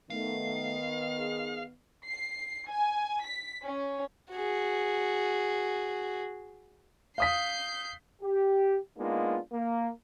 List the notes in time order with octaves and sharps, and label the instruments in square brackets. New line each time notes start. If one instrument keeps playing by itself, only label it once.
[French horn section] D#3 B3 [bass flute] A3 [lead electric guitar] F5
[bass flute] G#4
[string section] C7
G#5
B6
C#4
[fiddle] F#4 G#4
[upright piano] F5 D#6 B6 [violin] G6 C7
[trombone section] G4
G#3 A#3 B3 D4 D#4 F4
A#3